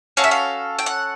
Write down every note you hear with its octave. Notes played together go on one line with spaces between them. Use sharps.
C#4 F#4 A4 F5
E5
F5
G5
F#5